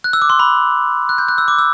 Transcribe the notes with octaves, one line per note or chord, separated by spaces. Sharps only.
F#6
E6
D6
C6
B5
F#6
G6
F#6
E6
D6
E6